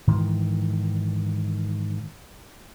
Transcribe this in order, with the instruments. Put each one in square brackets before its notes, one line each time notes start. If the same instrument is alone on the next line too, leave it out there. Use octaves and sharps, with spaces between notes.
[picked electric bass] G#2 D#3 E3